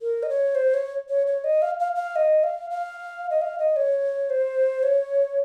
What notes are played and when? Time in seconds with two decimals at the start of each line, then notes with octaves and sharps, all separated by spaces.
0.02 A#4
0.23 D#5
0.29 C#5
0.55 C5
0.74 C#5
1.09 C#5
1.27 C#5
1.44 D#5
1.62 F5
1.80 F5
1.96 F5
2.16 D#5
2.44 F5
2.70 F5
3.30 D#5
3.42 F5
3.59 D#5
3.76 C#5
4.30 C5
4.83 C#5